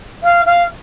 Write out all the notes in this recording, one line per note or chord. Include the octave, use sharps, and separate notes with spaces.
F5
F5